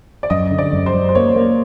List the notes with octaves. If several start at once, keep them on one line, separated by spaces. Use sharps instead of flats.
D5
F#2 D#5
D3
D5
F#2
C5
F#2
C5
A#3 C#5
A#3